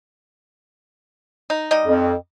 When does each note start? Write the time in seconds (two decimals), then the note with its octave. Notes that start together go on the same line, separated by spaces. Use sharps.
1.50 D#4
1.71 G3 D#4 D#5
1.86 F2